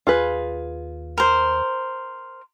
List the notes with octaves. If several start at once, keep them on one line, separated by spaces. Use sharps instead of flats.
D#2 F4 G#4 B4
A#4 C5